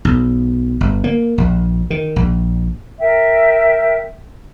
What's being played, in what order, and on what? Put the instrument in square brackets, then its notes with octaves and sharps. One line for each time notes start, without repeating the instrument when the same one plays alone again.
[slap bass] B1
G1
A#3
A#1
D#3
A#1
[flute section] A#4 E5 G5